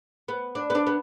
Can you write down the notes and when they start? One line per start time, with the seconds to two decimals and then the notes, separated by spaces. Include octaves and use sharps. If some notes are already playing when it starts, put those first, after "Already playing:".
0.28 B3
0.55 D4
0.70 B3
0.75 D4
0.87 B3